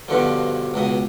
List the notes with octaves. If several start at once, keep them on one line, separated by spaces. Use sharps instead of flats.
G2 B2 D3 F3
C#2 B2 D#6